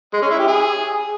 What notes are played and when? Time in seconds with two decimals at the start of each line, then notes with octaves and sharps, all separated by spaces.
0.13 G#3
0.22 C#4
0.30 E4
0.39 G4
0.47 G#4